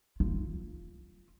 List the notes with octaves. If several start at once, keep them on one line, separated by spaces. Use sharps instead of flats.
F4